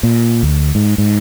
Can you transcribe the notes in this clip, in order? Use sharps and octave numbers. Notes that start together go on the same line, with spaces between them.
A#2
D2
G#2
G#2